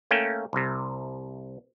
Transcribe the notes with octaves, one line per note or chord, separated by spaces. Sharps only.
A3 A#3 C#4 G5
C2 C3